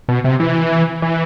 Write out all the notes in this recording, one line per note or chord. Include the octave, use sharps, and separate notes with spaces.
B2
C3
E3
E3